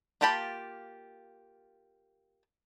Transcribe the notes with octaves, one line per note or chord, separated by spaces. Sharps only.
A#3 F4 G4 A5 B5